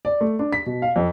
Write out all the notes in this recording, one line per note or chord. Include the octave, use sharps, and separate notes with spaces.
D5
A3
D4
B6
B2
F5
F2